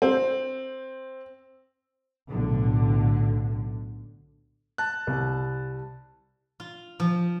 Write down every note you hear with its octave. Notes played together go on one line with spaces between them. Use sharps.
C4
B1 A2 D3
A5 F#6
C2
F4
F3